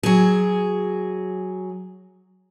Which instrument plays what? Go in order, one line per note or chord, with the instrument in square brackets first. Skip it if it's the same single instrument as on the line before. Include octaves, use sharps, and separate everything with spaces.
[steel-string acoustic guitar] F#3 G#4